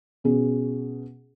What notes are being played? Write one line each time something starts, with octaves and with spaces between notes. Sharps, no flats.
B2 C#4 G#4